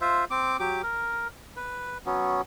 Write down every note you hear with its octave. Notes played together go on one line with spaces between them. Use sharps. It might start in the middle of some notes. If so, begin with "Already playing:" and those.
F4 C5 E5
C4 D6
F#3 G4 D6
A#4
B4
F#3 B3 C#4